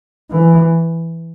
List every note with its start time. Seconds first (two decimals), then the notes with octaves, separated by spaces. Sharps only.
0.31 E3